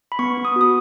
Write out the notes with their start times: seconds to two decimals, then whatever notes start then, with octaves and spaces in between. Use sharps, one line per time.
0.12 B5
0.19 B3 C#6
0.38 B3
0.45 D#6
0.56 F#4
0.61 D#6